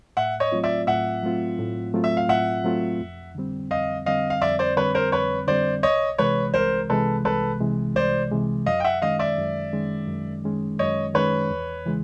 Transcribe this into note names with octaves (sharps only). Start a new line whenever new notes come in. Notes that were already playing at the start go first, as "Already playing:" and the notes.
A2 E5 F#5
C#5 D#5
F#3 A3 C4 F4
D5 E5
A2 E5 F#5
F#3 A3 C4 F4
A2
F#3 A3 C4 F4
E5
F5
A2 E5 F#5
F#3 A3 C4 F4
F2
D3 G3 C4
F2 D#5 F5
D3 G3 C4 D#5 F5
F5
F2 D5 E5
C5 D5
D3 G3 C4 B4 C#5
A#4 C5
F2 B4 C#5
D3 G3 C4 C5 D5
C2 C#5 D#5
C3 E3 G#3 B4 C#5
C2 A#4 C5
C3 E3 G#3 A4 B4
C2 A4 B4
C3 E3 G#3
C2 C5 D5
C3 E3 G#3
F#2 D#5 F5
G5
E5 F#5
D#3 G#3 C#4 D#5 F5
D5 E5
F#2
D#3 G#3 C#4
F#2
D#3 G#3 C#4
F#2 C#5 D#5
D#3 G#3 C#4 B4 C#5
E2
C#3 E3 G#3